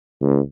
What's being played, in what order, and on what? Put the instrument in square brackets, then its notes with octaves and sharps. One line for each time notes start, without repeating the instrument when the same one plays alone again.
[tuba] C#2